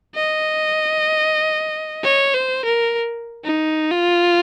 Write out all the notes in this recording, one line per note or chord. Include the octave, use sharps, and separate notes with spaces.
D#5
C#5
C5
A#4
D#4
F4